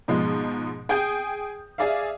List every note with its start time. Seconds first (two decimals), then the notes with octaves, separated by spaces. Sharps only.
0.08 G#2 B2 F3 G#3
0.89 G#4 G5 D#6 G6
1.78 G#4 D5 E5 F5